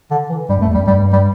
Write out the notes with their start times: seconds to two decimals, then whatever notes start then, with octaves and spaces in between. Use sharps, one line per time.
0.11 D3
0.30 E3
0.49 G2 G3
0.59 F#2 A3
0.68 E2
0.74 F#2 G3
0.87 G2 G3
1.13 G3